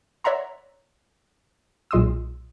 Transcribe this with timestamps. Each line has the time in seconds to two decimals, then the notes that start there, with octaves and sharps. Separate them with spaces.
0.24 C#5 D5 E5 F#5 A#5 C6
1.91 B1 A#2 G#3 C6 D#6 E6